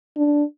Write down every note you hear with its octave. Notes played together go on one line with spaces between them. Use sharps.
D4